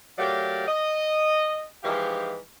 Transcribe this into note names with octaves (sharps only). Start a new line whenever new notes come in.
F#3 A3 G4 A#4 D5 F5
D#5
E3 F3 G#3 D#4 G4 F5